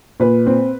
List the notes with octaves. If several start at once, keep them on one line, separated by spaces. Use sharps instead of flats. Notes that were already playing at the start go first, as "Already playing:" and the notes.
A#2 B4
C4